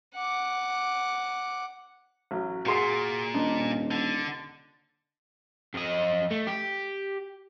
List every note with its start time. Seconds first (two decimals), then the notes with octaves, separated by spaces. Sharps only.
0.15 F#5 D6
2.31 A1 F#3
2.66 A#2 F#4 G#4 C6 C7
3.34 D#1 D4 D#4
3.91 D3
5.74 F2 D#5
6.31 A3
6.47 G4